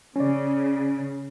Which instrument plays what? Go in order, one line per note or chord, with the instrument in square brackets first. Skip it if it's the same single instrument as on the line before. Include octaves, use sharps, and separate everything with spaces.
[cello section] C#3 [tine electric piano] C#4 D5